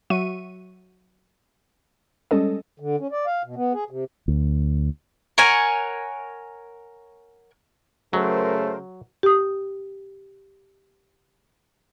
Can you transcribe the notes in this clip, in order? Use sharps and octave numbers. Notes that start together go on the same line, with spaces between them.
F#3 F#4 E5 C#6 D#7
G3 G#3 C#4 A4 D#5
D3
C#4
D5
F5
B2
B3
G#4
C3
D2
A#4 C#5 F#5 G#5
C#3 F#3 A3 A#4 C5
G4 D#6